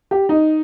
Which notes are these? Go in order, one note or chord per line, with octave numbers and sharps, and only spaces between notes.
G4
D#4